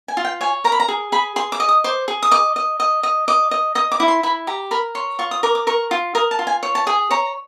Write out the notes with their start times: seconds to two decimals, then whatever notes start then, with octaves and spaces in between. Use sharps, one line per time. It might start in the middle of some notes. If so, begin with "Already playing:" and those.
0.08 G#5
0.17 F4
0.25 G5
0.41 C#5 G#5
0.64 A#4 A#5
0.72 B5
0.80 A#5
0.88 G#4
1.12 G#4 B5
1.36 G#4 C6
1.52 D6
1.60 D#5
1.69 D#6
1.84 C5 D6
2.08 G#4
2.23 D#6
2.31 D#5 D6
2.56 D#5
2.80 D#5
3.03 D#5
3.28 D#5 D6
3.51 D#5
3.75 D#5 D#6
3.92 D6
4.00 E4
4.08 C6
4.23 E4 B5
4.47 G4 A#5
4.71 A#4 B5
4.95 C#5 C6
5.19 F4 C#6
5.31 D#6
5.43 A#4 D6
5.55 D6
5.67 A#4 C#6
5.91 F4
6.15 A#4 D#6
6.31 A5
6.39 F4
6.47 G#5
6.63 C#5
6.75 A5
6.87 G#4 G#5
7.11 C#5 A#5